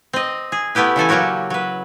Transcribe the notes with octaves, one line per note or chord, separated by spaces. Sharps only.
C4 D#5
G#4
A3 B3 E4 G4 B4
C#3 E3 A4 G#5
F#3 A#3 C#4 F#4 G4
F#3 B4